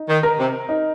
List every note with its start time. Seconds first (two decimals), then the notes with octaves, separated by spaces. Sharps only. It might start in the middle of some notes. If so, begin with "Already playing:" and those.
Already playing: D#4
0.09 D#3
0.23 A#4
0.39 C3
0.69 D#4